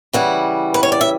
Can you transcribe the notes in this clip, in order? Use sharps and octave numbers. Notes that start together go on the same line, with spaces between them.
C#3 E3 G3 F#5
B4
C#5
D5
E5